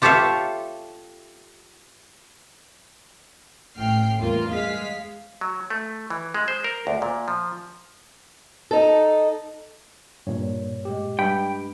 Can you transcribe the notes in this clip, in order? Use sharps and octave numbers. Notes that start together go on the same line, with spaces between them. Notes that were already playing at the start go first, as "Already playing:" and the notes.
F4 G4 A4 C#5 E5 F5
A1 A2 G5 F6 C7
E2 G2 A#3 F4
G#3 F5 B6
F#3
A3
E3
G#3
C5
A#4
D2
A#2
F3
D#4 A4
G2 A#2 C#5
G#3 G4
G2 G5 B5